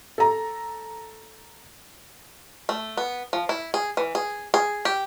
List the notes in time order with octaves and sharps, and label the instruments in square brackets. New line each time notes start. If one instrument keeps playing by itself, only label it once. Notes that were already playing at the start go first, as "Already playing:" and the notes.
[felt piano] A4 A#5
[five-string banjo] A3
B3
F3
E4
G#4
E3
G#4
G#4
G4